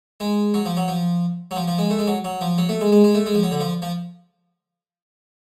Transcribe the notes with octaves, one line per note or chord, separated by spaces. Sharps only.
G#3
F#3
F3
F#3
F3
F#3
F3
F3
G#3
A3
G#3
F#3
F#3
F3
F#3
A3
G#3
G#3
G#3
A3
G#3
F3
F#3
D3
F3
F3